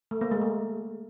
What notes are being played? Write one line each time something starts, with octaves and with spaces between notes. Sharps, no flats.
A3
A#3
G#3
A3